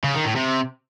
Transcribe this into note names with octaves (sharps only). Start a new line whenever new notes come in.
C#3
D#3
A2
C3